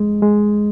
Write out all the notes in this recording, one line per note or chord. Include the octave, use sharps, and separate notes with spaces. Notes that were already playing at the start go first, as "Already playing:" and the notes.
Already playing: F2 G#3
G#3